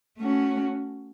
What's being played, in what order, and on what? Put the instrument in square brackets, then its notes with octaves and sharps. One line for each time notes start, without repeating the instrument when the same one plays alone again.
[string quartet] A3 C#4 F#4